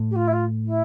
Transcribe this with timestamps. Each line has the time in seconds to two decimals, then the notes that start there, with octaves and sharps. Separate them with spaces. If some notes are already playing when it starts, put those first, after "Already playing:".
Already playing: A2
0.11 G4
0.15 F4
0.27 E4
0.32 F4
0.65 E4